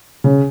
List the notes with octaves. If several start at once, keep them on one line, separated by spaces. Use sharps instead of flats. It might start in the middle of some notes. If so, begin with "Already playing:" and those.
C#3